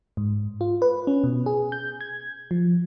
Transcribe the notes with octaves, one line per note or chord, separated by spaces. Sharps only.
G#2
F4
B4
C#4
B2
G#4
G6
G#6
F3